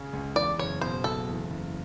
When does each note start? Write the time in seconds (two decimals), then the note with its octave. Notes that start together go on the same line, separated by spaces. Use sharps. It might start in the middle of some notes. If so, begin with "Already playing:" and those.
Already playing: C#3 C#5
0.13 C#2
0.36 E2 D5
0.59 F#1 C#5
0.81 B2 C5
1.04 F#1 A4
1.28 E2
1.50 F#1